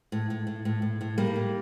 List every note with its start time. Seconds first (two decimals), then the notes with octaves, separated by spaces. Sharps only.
0.12 A2
0.30 A2
0.47 A2
0.65 A2
0.82 A2
1.01 A2
1.18 A2 G3 A#3
1.36 A2